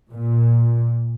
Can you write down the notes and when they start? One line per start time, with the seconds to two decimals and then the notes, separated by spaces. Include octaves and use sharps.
0.11 A#2